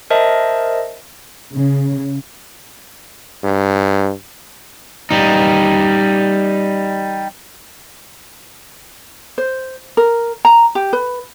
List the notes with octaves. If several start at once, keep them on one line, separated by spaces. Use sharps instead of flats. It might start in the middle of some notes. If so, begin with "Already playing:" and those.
A#4 C5 D#5 E5 A5
C#3
G2
G3 D#4
C5
A#4
A#5
G4
B4